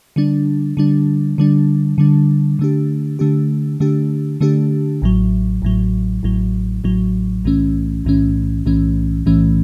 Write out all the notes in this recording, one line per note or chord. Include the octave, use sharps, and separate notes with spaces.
D3 G3 D4
D3 G3 D4
D3 G3 D4
D3 G3 D4
D3 A3 D4 G4
D3 A3 D4 G4
D3 A3 D4 G4
D3 A3 D4 G4
A1 A2 F#3
A1 A2 F#3
A1 A2 F#3
A1 A2 F#3
B1 A2 E3 A3 C#4
B1 A2 E3 A3 C#4
B1 A2 E3 A3 C#4
B1 A2 E3 A3 C#4